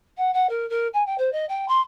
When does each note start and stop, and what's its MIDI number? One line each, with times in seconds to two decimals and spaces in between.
0.17 0.33 78
0.33 0.47 78
0.49 0.67 70
0.69 0.87 70
0.93 1.05 80
1.06 1.15 79
1.18 1.32 72
1.32 1.45 75
1.49 1.65 79
1.68 1.80 84